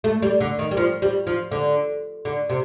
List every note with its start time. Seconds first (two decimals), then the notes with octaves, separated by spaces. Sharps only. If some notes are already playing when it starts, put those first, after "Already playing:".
0.04 A3
0.22 G3
0.40 D3
0.59 D#3
0.71 G3
0.77 F3
1.02 G3
1.27 F3
1.51 D3
2.25 D3
2.50 C3